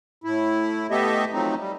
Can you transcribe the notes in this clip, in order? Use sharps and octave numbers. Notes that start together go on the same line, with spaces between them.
A2 E4
A3 B3 G4 A4 D#5 E5
F3 F#3 A3 C4 D#4
G3